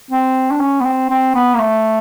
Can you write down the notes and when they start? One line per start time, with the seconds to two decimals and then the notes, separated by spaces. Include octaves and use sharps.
0.11 C4
0.51 D4
0.60 C#4
0.81 B3
0.85 C4
1.10 C4
1.35 B3
1.54 A#3
1.60 A3